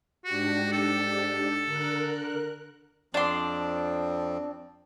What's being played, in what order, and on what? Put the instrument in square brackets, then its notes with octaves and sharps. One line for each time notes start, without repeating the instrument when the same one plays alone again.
[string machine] G#2 D4 G4 [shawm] F#4
[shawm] A4
[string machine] D3 A#4 F#6
[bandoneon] F2 F3 C4 [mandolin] D4 C6